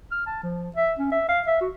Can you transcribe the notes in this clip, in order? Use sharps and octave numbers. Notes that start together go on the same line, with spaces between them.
F6
A5
F3
E5
C#4
E5
F5
E5
F#4